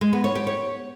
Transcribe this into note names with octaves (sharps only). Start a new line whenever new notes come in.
G#3
B3
C#5
G4
C#5